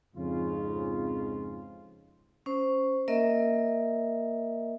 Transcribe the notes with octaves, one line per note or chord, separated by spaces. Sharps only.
F2 G#2 C#3 F4
C#4 C5
A#3 A#4 D#5 E5